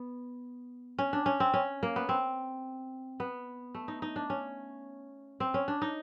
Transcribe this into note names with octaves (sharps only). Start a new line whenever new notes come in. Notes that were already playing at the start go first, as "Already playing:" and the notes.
Already playing: B3
C#4
D4
C#4
C4
C#4
A#3
B3
C4
B3
A3
D#4
D#4
D4
C#4
C4
C#4
D4
D#4